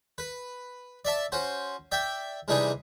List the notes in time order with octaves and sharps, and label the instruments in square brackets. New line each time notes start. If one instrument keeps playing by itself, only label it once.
[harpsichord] B4
D5 E5 A5
C#4 F#4 C5
D5 E5 G5
C3 E3 G3 D4 D#4 G#4